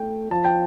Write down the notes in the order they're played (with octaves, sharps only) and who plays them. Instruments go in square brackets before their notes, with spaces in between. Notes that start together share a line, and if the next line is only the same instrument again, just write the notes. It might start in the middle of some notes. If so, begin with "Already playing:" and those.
Already playing: [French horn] A3 [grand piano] G5
[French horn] F3 [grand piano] A5
[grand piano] G5